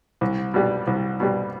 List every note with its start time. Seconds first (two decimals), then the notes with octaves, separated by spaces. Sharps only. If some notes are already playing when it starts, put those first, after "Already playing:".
0.21 C2
0.54 B2 G3
0.87 C2
1.20 B2 G3